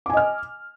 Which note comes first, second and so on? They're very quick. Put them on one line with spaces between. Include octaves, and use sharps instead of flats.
D6 G#5 D#5 F6